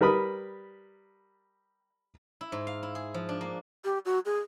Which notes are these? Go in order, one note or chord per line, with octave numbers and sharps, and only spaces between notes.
G3 A#4 B4 B5 D#6
E4
G#2
F5
E4
G#4
F3
D4
A#3
G4
F#4
G#4